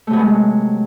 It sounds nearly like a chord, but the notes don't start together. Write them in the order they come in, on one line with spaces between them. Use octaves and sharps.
A3 C3 F#3 B3 G#3